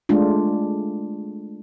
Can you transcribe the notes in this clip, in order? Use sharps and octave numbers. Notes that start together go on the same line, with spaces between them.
G#3 A3 D4 F4